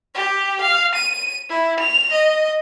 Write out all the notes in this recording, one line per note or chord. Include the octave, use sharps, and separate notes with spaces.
G4
F5
D#7
E4
F7
D#5